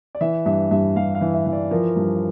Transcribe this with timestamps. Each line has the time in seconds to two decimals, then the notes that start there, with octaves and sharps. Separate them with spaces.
0.15 D5
0.21 E3 E5
0.46 G2 E5
0.71 G2 E5
0.96 G2 F5
1.15 F5
1.21 E3
1.34 E5
1.46 E3
1.52 D5
1.71 F3 A#4
1.96 G2